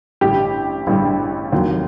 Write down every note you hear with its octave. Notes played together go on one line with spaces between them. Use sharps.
A1 G2 D3 G3 G4
A1 G2 D3 G3
F1 D#2 D#3 F#3